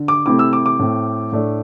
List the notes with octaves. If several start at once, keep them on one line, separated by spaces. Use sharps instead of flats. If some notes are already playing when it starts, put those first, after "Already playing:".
Already playing: D3
D6
C3 A3 C4 E4 D6
E6
D6
D6
A2 A3 C4
A2 A3 D4